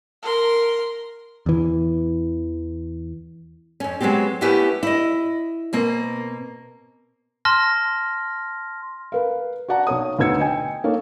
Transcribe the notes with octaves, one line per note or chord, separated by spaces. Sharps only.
A#4 C6
E2 E3
F2 C#4
F#3 G#3 B3 C4 G4
A3 B3 C#4 E4 G4 B4
E4 D#5
B2 A#3 C4
A5 C6 F6 A#6
A#4 B4 F5
F#4 D5 F#5 A5 A#5
B1 C#5 D#6
D2 B2 D#4 E6 G#6 C#7
D#5 G5 G#5
A#3 D#4 A4 C#5